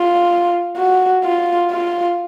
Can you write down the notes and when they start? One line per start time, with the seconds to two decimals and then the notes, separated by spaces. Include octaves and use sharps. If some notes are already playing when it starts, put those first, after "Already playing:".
Already playing: F4
0.77 F#4
1.25 F4
1.71 F4